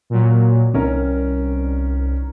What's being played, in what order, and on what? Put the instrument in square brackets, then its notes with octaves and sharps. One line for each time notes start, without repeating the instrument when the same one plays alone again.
[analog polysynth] A#2 F#3
[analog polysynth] C2 [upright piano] D#3 C#4 A#4